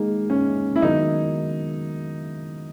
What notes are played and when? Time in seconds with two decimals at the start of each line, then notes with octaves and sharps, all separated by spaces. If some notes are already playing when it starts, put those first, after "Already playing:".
Already playing: G#3 A#3 D#4 G#4
0.30 C#4
0.76 E4
0.82 D#3 F#3 B3 D#4 F#4 A#4